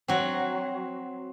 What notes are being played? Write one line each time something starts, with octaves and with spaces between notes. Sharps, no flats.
F#3 C4 F#4